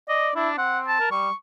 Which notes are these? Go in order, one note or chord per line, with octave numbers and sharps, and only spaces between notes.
D5 D#5
D4 E4
C4 F#5
A5
A#4
G3 C#6